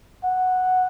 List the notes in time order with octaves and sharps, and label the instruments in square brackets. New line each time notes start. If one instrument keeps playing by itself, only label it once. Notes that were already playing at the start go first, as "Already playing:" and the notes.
[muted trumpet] F#5